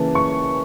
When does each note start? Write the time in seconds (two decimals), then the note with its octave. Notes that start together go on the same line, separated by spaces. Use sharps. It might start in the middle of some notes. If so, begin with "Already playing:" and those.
Already playing: C#3 E3 A#3 A5
0.15 C#6